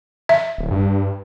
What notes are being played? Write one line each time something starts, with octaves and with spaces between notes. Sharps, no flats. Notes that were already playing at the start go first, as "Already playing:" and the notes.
E5
D1
G2